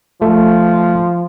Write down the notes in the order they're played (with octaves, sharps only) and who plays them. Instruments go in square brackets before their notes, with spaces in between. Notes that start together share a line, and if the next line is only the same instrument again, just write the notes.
[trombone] F3 [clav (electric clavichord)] A3